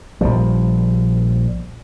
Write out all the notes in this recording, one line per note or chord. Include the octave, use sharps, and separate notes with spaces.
A#1 F3 G3